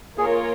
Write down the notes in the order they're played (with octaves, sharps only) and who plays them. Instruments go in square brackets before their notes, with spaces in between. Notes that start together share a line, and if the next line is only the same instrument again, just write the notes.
[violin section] A#3 F4 A#4 C#5 [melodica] G#4